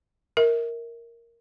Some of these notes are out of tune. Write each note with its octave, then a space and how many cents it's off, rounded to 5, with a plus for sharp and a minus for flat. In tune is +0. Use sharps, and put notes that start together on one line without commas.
A#4 +0 E5 -35